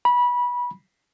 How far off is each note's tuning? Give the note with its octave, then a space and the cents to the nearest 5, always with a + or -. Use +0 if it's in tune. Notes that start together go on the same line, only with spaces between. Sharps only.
B5 -20